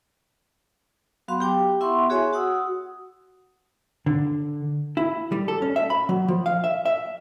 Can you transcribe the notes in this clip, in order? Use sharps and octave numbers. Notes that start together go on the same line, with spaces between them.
F#3 B3 F#4 F5 C6
G4 G5 D6
B3 E4 E5 F#5 C6 C#6
F#4 G#4 C#5 E5 G#5 C6
F#4 F#5 D#6 E6
D3
E4
G3
A4
C#4
E5
B5
F#3
F3
F5
E5
E5